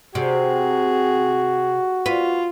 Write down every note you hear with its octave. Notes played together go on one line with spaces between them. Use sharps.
C3 F#4 G#4
F4 B4